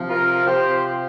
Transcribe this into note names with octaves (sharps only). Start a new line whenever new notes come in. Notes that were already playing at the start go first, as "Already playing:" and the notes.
Already playing: C3 F3
F4 A#4
C3 F3 G4 C5